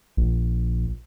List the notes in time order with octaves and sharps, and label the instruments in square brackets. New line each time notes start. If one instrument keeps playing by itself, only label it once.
[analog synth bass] A#1